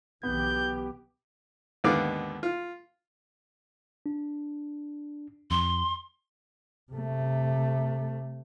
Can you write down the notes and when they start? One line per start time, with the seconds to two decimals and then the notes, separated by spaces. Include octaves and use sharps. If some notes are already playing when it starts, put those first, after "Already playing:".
0.23 B1 E3 B3 G4 G6
1.84 D#2 G#2 D3 B3 D5 F5
2.43 F4
4.06 D4
5.51 F2 C6
6.93 C3 A3